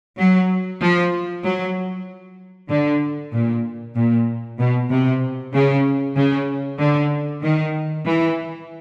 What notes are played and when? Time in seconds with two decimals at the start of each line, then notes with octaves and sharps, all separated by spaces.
0.18 F#3
0.81 F3
1.44 F#3
2.69 D3
3.33 A#2
3.95 A#2
4.59 B2
4.90 C3
5.54 C#3
6.16 C#3
6.78 D3
7.42 D#3
8.06 E3